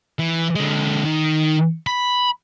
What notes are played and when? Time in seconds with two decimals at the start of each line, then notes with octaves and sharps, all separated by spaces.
0.19 E3
0.55 D3 G#3
1.04 D#3
1.87 B5